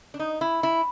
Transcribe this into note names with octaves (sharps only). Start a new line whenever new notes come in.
D4
D#4
E4
E4